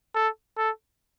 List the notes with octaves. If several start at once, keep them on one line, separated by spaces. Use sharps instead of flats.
A4
A4